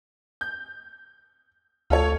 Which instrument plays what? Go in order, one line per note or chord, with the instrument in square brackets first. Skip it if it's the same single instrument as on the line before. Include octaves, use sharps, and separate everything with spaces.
[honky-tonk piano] G6
[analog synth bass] D2 [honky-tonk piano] F4 A4 C#5